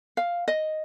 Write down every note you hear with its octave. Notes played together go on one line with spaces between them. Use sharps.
F5
D#5